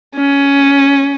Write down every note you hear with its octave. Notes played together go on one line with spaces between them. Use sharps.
C#4